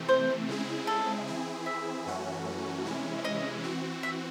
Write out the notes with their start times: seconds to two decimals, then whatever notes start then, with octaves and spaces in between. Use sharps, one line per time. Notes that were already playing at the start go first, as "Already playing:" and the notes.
Already playing: C3 E3 A3 C4
0.09 C5
0.49 C#3 G#3 C4 E4 G#4
0.87 A4
1.28 E3 C4 E4 G#4
1.66 E5
2.06 F#2 E3 A3 C#4 F#4
2.85 C3 E3 G#3 C#4 E4
3.24 D#5
3.64 E3 C4 F#4
4.03 E5